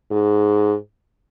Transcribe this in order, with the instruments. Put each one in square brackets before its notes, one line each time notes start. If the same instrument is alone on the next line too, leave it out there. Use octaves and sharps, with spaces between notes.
[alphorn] G#2